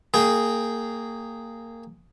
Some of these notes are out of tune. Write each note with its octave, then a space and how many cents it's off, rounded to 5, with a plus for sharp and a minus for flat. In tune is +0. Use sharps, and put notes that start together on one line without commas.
A#3 -20 G#4 +0 G5 +0